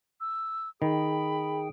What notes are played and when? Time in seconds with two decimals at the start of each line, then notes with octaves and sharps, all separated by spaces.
0.21 E6
0.82 D#3 G#4 G5 B5